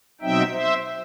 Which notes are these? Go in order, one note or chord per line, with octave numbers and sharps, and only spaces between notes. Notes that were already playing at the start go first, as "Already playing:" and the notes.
B2 F#3 C4 D#4 E5 G5
C5 E5